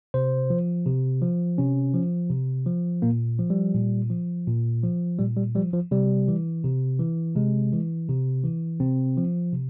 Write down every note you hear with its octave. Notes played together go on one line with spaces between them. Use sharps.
C3 C5
F3
C3
F3
C3 C#4
F3
C3
F3
A#2 A#3
F3
G3
A#2
F3
A#2
F3
A#2 G3
G3
F3 G3
F3
C3 G3
E3
C3
E3
C3 G#3
E3
C3
E3
C3 C4
F3
C3